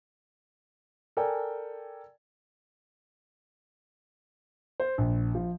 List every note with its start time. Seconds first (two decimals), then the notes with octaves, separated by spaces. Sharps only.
1.17 A4 A#4 D5 G5 G#5
4.80 C5
4.98 A#1
5.35 F3